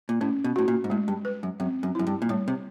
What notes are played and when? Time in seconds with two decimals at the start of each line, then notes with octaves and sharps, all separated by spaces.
0.09 A#2
0.21 A2 C#4
0.44 B2
0.56 A2 F#4
0.68 A#2
0.84 G#2
0.90 A2 G#3
1.08 G2
1.25 B4
1.43 F#2
1.60 F#2 C4
1.83 F#2
1.95 F#2 E4
2.07 G2
2.22 A#2
2.29 A2 G3
2.48 C3